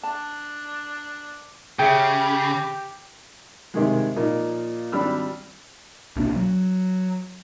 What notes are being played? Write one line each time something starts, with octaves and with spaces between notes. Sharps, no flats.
D4 A5
C#3 G4 G#4 E5 F#5 G5
G2 C3 D#3 G#3
A#2 F3 A#3 D#4
G#1 G3 D4 B5 E6 F6
C2 B2 A#3 D4
F#3